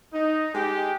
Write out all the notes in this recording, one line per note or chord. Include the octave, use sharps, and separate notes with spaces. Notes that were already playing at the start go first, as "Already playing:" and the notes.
D#4
G#3 D#4 G4